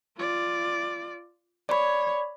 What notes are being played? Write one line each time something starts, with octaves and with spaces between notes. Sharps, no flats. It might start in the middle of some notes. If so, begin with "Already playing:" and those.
F4 D5
C#5 D5 B5